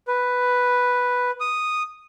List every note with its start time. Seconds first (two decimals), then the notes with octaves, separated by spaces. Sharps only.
0.08 B4
1.40 D#6